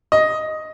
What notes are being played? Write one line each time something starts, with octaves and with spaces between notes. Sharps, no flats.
D#5